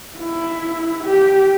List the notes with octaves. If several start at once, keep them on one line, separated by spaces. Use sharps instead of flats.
E4
G4